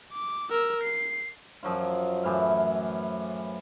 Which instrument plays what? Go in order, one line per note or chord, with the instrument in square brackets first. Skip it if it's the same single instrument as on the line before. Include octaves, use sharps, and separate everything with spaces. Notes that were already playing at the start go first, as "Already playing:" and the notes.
[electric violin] D6
A#4 E6
C7
[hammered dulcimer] F#2 F3 F#3 F4
F#2 A2 E3 F5